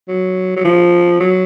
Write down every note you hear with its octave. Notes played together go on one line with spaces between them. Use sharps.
F#3
F#3
F3
F#3